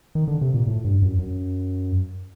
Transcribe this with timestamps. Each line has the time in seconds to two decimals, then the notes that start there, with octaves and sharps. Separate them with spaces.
0.15 D#3
0.28 D3
0.41 C3
0.54 A#2
0.67 A2
0.84 G2
1.02 F#2
1.19 F#2